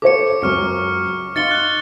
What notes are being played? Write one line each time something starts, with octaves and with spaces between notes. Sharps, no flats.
A4 C5 C#5 D6 C#7
C#2 F#2 C#6 F6 C#7
D#4 F5 C6 A6 C#7 G7
F#6